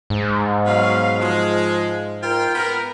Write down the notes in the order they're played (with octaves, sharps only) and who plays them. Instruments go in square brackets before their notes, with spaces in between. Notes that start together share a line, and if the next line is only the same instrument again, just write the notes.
[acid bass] G#2
[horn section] B2 F#3 F5
F3 G#3
F4 A#4 G5
B3 A#4